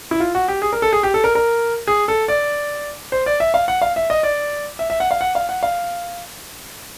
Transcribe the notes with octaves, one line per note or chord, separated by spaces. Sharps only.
E4
F4
F#4
G4
G#4
A#4
A4
G#4
G4
A4
A#4
A#4
G#4
A4
D5
C5
D5
E5
F5
F#5
F5
E5
D#5
D5
E5
E5
F#5
F5
F#5
F5
F#5
F5